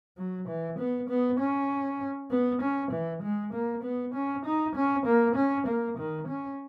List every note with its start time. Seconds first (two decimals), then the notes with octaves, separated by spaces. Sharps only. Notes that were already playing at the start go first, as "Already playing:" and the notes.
0.18 F#3
0.48 E3
0.79 B3
1.09 B3
1.39 C#4
2.31 B3
2.62 C#4
2.92 E3
3.23 G#3
3.53 A#3
3.83 B3
4.14 C#4
4.45 D#4
4.75 C#4
5.06 A#3
5.36 C#4
5.67 A#3
5.98 D#3
6.28 C#4